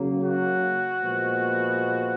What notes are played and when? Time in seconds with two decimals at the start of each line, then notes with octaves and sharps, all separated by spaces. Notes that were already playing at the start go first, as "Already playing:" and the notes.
Already playing: C#3 F#3 A#3
0.24 F#4
1.03 A#2 F3 G#3 B3